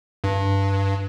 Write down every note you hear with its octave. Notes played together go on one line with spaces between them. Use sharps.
G2